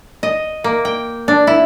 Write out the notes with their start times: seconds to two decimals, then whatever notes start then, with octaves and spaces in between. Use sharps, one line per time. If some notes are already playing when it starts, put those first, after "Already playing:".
0.23 D#5
0.64 A#3
0.85 G5
1.28 D4
1.47 E4